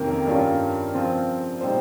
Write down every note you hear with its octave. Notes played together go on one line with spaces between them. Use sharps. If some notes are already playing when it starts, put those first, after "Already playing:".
Already playing: F2 C3 D#3 A#3 C#4 A#4
G2 G3 C#4 F4
C#3 F3 C4 F4
A#2 G3 C4 D#4 C5